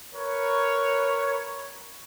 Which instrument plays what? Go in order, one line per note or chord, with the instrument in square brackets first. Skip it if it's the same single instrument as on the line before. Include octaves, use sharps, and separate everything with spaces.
[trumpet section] A#4 B4 C#5